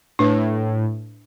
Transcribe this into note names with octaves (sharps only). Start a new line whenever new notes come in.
A2 D4 B4